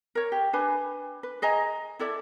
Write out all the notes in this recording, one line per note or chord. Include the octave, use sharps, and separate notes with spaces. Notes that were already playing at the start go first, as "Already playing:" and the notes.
A#4 C#5
G4
D4 B4 G#5
B4
G#4 D#5 G#5 A#5
E4 A4 D5 E5